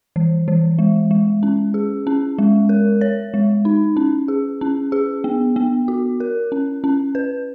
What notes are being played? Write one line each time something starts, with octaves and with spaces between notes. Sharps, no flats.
E3
E3
G#3
G#3
C#4
G#4
C#4
G#3
A#4
C#5
G#3
D#4
C#4
G#4
C#4
G#4
B3
B3
F#4
A#4
C#4
C#4
B4